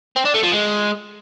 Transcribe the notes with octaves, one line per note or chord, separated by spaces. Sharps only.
C4
D4
A3
F3
G#3